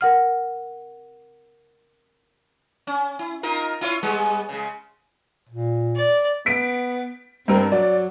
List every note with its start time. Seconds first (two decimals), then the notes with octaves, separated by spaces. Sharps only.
0.01 A#4 F#5 F6
2.87 C#4
3.19 E4
3.43 D#4 F4 A#4
3.81 E4 F4 C#5
4.03 G3 G#3 B3
4.49 C#3 G#3
5.49 A#2
5.96 D5
6.46 B3 B6 D7
7.48 G2 C4 A#4
7.72 F#3 D5